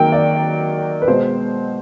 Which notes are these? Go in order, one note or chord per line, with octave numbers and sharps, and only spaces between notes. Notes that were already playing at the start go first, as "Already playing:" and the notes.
Already playing: D#3 F#3 A#3 G5
D5
B4
B2 G#3 C5